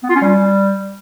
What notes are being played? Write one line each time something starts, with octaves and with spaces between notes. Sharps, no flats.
B3
F4
C#4
G3